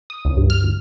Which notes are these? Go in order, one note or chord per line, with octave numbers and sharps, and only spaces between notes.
D#6
C#2
G2
F6
D2